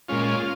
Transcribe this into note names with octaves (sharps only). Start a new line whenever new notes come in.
A#2 G#3 C#4 F4